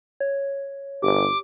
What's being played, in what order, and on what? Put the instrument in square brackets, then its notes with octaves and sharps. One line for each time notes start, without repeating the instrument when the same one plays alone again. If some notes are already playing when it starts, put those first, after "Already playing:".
[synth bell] C#5
[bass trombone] G1 [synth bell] G4 [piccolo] D6